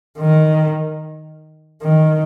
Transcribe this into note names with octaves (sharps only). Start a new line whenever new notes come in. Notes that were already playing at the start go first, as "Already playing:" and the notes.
D#3
D#3